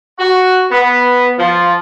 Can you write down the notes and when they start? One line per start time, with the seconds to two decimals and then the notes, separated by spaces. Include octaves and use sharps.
0.19 F#4
0.71 B3
1.39 F3